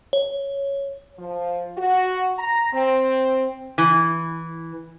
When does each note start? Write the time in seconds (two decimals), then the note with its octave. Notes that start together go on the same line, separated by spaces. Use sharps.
0.13 C#5
1.19 F3
1.78 F#4
2.39 A#5
2.73 C4
3.78 E3